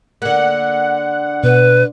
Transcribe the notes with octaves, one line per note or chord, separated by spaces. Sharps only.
D3 A#3 F#5
B2 B4